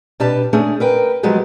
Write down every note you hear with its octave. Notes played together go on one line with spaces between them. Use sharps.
B2 D4 G4 B4 A5
A3 C#4 D4 G#4
A#4 B4 G5
F3 F#3 G#3 B3 G4